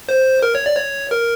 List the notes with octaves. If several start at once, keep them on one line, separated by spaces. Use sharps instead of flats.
C5
A#4
C#5
D5
C#5
A#4